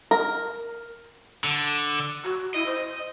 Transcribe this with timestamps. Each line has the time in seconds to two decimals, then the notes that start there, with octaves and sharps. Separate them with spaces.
0.11 A#4
1.44 D3
2.24 F#4
2.54 E4 D#5
2.66 C5